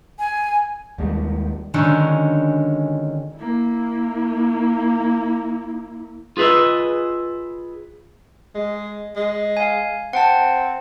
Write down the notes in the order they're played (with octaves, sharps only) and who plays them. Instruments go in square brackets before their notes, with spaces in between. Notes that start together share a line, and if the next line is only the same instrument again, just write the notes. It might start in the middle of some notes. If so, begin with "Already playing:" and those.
[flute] G#5
[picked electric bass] D#2 G3 G#3
[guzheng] D3 D#3 F#3 G#3 C#4 D#4
[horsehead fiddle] A#3 E4
[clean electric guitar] F4 G#4 B4 D#5 E5
[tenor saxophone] G#3
G#3
[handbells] F5 G#5
[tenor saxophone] C4 [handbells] F#5 G5 A5